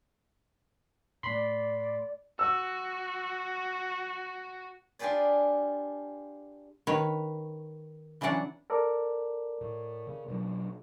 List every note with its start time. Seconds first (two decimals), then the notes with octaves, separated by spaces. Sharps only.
1.23 A2 A3 D5 B5 C6
2.39 F#4 E6
4.99 D4 F4 G4 G#4 B4 D5
6.87 D#3 B4 C#5
8.21 C#3 E3 F#3 D4 D5 F#5
8.70 A4 A#4 D5
9.61 A2
10.07 C#3
10.28 B2 F#3 D4